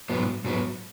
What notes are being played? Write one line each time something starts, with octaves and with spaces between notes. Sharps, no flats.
G#2 F#3 B3
G#2 F#3 B3